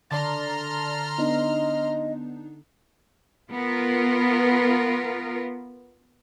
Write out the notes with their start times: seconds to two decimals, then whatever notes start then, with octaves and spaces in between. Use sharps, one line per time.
0.11 D3 D5 A5 A#5 C6 F6 A6
1.18 B3 D4 D#4 D#5
3.49 B3 F4 A#4